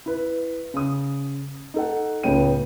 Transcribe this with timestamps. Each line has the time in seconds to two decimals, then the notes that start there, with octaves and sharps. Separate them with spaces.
0.06 E4 B4
0.74 C#3 D#6
1.74 D#4 A4 F#5
2.23 C#2 A2 B3 C#4 G5 D#7